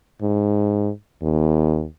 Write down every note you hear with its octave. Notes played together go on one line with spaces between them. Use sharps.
G#2
D#2